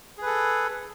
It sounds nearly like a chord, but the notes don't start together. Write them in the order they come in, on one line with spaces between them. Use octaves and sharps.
G#4 B4 A4